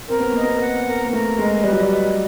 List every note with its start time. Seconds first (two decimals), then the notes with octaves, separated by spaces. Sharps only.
0.09 C4 A#4
0.20 B3
0.32 A#3 D#5
0.43 B3
0.60 F#5
0.86 A#4
1.05 A#3
1.12 A3 A#4
1.38 G#3 D#5
1.63 G3 B4
1.72 F#3
1.81 G3
1.89 D#5